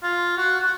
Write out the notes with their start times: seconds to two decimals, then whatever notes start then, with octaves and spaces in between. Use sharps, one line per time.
0.03 F4
0.38 F#4
0.61 F#4